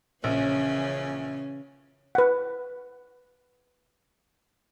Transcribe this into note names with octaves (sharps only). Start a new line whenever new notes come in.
A#1 C#3 E3 C#4
B4 F#5